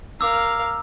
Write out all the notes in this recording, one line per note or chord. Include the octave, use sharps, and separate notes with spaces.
A#4 F5 D6 E6